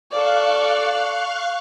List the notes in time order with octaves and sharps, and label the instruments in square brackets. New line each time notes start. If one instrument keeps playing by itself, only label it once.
[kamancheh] A4 D5 [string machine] F5 C#6 F#6